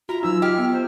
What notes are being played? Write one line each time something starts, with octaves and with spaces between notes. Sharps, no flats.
F4 F#4 A#5
F#3 D#4 E6
G4 D#5 G5 F6
B3
C5